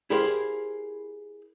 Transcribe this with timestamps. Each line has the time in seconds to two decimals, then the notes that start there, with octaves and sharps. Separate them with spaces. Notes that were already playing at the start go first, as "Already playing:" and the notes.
0.10 E4 G4 G#4 A#4 C5 F5